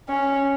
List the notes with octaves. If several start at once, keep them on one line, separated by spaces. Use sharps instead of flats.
C#4